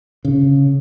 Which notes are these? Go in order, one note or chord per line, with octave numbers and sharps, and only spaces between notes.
C#3